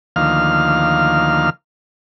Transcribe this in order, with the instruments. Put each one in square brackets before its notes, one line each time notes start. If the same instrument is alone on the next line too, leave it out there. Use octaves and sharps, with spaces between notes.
[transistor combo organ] D2 D#3 F3 A#3 F5 F6